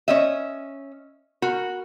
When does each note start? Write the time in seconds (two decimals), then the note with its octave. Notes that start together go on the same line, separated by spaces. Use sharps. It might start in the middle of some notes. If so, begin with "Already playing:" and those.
0.08 C#4 D#5 E5
1.42 F#4 A#4